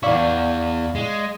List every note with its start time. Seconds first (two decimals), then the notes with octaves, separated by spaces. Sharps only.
0.03 E2 E4 D5 F5 C#6
0.95 G#3